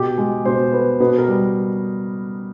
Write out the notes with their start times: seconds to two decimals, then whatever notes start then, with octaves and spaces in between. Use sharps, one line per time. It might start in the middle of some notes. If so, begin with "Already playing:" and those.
Already playing: B2 G4
0.18 G#3
0.45 B2 C5
0.72 B3
1.00 B2 B4
1.18 A#4
1.28 G3